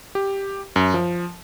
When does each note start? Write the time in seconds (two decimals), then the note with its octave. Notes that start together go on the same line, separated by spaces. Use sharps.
0.15 G4
0.76 F#2
0.94 F3